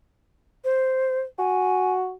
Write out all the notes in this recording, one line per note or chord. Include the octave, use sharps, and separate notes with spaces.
C5
F#4 G#5